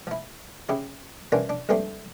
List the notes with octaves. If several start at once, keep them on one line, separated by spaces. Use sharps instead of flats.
F3 E4
C#3 E4 G4
E3 G3 A#3 C#4 D4 F4
D4
A#1 G2 G3 A3 C4